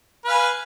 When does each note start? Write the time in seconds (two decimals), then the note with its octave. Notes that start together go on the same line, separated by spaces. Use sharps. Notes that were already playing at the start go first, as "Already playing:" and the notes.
0.25 B4
0.28 F5
0.31 G#5